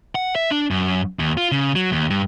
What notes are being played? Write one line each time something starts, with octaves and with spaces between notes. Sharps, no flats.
F#5
E5
D4
F#2
D#2
F4
C#3
F#3
D#2
G2